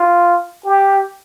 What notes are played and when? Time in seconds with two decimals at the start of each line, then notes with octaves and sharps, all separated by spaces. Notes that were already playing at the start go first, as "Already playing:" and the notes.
Already playing: F4
0.65 G4